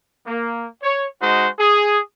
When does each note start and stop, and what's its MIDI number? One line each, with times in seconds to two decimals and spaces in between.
0.27 0.66 58
0.82 1.06 73
1.21 1.48 56
1.21 1.48 63
1.21 1.48 66
1.21 1.48 72
1.59 1.99 68